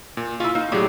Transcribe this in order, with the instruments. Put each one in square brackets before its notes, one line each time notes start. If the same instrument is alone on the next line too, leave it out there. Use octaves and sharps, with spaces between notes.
[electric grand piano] A#2
[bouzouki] C#4 E4 [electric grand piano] F4
[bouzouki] A#3 [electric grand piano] D#4
[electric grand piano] A2 F#3 [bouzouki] D4 G4 G#4